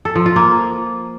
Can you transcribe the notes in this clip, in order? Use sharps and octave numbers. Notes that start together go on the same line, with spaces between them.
A4
F3
F4
A#3